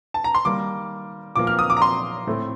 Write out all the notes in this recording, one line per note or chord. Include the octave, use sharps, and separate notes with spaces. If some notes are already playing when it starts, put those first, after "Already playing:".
A5
A#5
C6
D#3 G3 A#3 D6
A#2 F3 A#3 D6
F6
D#6
D6
A#5
C6
A2 A3 C4